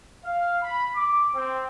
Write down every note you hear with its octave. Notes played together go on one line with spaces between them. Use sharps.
F5
B5
D6
C4